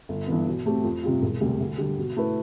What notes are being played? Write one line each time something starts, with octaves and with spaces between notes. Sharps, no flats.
G1
G2 E3 B3
B2
A3 C4 G4
F2
C3 G3 C4 F4
E1
D2 C3 G3
D2
D3 G3
B2
A3 E4 B4